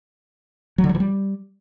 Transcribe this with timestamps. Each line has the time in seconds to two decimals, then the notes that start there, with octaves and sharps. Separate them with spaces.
0.78 F#3
0.84 D3
0.89 F#3
0.95 E3
1.00 G3